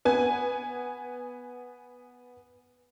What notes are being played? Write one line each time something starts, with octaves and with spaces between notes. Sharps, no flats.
B3 G#5